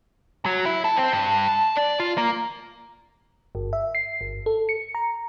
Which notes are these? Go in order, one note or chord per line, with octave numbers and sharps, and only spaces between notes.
F#3
E4
A4
C4
G2
A5
D5
F4
A#3
G1
E5
C7
G1
A4
C#7
A#5